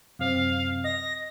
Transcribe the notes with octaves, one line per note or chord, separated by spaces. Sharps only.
F#2 C3 C4 F5
D#5 A#6